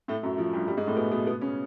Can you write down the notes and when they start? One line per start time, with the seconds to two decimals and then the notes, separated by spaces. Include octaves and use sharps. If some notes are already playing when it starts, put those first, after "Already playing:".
0.08 A2 A3
0.23 F#2 F#3
0.38 F3
0.53 G2 G3
0.68 G2 G3
0.77 G#2 G#3
0.87 A2 A3
0.97 B2 B3
1.11 B2 B3
1.27 B2 B3
1.41 C#3 C#4